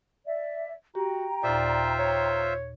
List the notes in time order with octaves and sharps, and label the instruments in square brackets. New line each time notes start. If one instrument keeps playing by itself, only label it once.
[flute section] D5 E5
[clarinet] F#4 [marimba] G4 [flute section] G5 A#5
[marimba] D#2 A#2 [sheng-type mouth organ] F4 C5 E5 [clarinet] D5
[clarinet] C#5